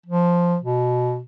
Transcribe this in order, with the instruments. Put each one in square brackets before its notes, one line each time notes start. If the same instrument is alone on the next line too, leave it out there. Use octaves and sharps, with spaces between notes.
[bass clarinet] F3
B2